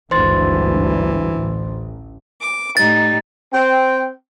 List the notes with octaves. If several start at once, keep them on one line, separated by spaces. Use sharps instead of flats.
G#1 D2 G2 E3 C5 C6 A6
A1
D6
A2 G3 D#4 A6
C4 G5